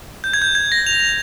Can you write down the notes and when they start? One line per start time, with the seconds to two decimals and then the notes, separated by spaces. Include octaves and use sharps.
0.24 G6
0.33 G#6
0.42 G6
0.55 G#6
0.72 A#6
0.87 F7